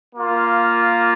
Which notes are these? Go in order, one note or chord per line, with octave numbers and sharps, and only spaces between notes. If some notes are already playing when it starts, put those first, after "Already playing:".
A#3 F4